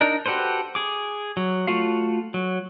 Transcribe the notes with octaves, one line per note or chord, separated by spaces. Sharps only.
D4 D#4 A#4
F#4 G4 A4 B4 C5
G#4 D6
F#3
A3 F4 F#4 F5
F#3